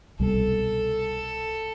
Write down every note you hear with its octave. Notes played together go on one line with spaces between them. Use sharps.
C2 B2 G3 A4